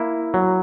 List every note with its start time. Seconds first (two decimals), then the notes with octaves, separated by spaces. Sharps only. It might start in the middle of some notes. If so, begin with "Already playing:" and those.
Already playing: A#3 E4
0.34 F#3